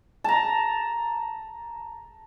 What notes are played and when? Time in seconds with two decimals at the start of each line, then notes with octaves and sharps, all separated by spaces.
0.24 A5 A#5